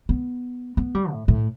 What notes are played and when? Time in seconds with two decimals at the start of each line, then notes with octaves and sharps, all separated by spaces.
0.09 B3
0.77 B3
0.95 G3
1.12 A2
1.28 A2